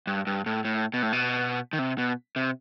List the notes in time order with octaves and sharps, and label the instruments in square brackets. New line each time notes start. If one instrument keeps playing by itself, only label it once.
[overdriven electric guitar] G2
G2
A2
A2
B2
A2
B2
D#3
C3
B2
C3